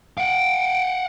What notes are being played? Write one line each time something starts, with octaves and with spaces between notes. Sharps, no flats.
F5 F#5 D7